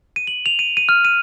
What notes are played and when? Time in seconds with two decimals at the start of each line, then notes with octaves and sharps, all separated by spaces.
0.16 D#7
0.27 F#7
0.46 F7
0.59 D#7
0.77 D#7
0.89 F6
1.05 D#7